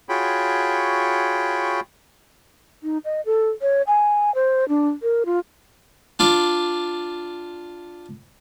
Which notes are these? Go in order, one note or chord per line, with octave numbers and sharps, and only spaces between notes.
F4 F#4 G#4 C#5 G5 B5
D#4
D#5
A4
C#5
G#5
C5
D4
A#4
F4
D4 F4 D5